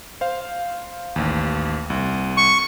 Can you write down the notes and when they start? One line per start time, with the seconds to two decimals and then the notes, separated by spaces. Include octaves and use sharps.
0.21 C5 F5
1.16 A1 D#2
1.90 C2
2.37 C#6